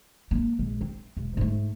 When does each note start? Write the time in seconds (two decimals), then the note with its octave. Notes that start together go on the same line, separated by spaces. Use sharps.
0.31 A#3 D4
0.59 A#1 G#3
0.81 C4
1.17 E1
1.37 G#2 A3